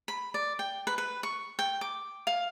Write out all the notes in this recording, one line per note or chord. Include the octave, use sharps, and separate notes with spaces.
B5
D5
G5
B4
B4
C#6
G5
D6
F5